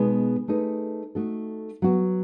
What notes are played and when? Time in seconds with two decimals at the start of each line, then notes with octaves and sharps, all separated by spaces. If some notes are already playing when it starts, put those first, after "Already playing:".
Already playing: B2 G#3 B3 D#4 G#4
0.48 A3 D#4 G#4 B4
1.15 A3 D#4 F#4 A4
1.82 F#3 B3 F#4